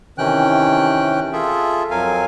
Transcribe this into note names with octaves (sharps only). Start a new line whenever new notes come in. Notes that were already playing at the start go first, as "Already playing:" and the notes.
C3 D#3 E3 C#4 G5 F#6
F4 G#4 A4 E5
F2 F#3 A#4 F5 G#5